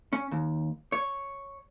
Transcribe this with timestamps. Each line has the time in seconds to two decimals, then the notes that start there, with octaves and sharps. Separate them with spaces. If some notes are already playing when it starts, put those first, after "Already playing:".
0.13 C#4
0.31 D#2
0.92 C#5